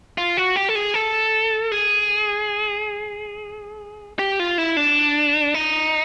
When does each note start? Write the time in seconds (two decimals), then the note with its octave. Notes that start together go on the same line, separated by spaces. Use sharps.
0.18 F4
0.37 F#4
0.56 G4
0.69 A4
0.75 G#4
0.94 A4
1.72 G#4
4.19 G4
4.40 F4
4.58 E4
4.77 D4
5.54 D#4